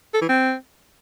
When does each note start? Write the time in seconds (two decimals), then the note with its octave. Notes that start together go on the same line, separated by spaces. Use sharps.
0.14 A4
0.21 E3
0.29 C4